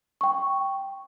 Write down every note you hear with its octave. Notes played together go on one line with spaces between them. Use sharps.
G5 C#6